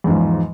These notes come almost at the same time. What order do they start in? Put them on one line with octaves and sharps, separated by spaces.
E2 G#2 F3